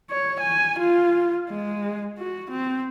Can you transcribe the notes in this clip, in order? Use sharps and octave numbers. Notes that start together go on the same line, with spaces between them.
C#5
G#5
F4
G#3
F#4
C4